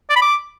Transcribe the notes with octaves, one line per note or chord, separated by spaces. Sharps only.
D5
B5
D6